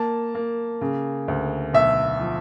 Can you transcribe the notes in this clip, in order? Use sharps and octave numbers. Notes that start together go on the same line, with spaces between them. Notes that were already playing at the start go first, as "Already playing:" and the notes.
Already playing: A#3 A5
A#3
C#3
D2
B1 E5
F3